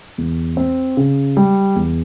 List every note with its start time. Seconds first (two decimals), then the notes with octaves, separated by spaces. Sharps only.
0.18 E2
0.57 C4
0.97 C#3
1.37 G3
1.76 E2